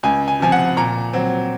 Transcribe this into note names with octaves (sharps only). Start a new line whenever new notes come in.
C#2 G#5
G#5
C3 F3 G#5
F#5
A#2 A#5
F#3 C4